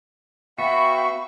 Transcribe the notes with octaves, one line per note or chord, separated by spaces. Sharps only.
B3 F#4 E5 F5 G5 B5 C#6